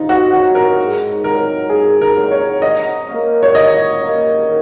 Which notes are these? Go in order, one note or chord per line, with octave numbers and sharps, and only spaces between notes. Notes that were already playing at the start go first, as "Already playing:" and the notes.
Already playing: C3 C4 D#4 F4
F#4
F#3 C4 F#4
A#4
G#2
F#3 C4 D#4 A#4
G#2 G#4
A#4
F#3 C4 D#4
C#5
F#3 D#5
A#3 C#4
C#5
F#3 D#5
A#3 C#4
D#3